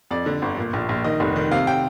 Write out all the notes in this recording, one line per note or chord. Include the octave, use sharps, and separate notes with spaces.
F2 D5
D3
G1
A#2
A#1
A#1
D#3 D#5
F1
D#3
C3 F5
G5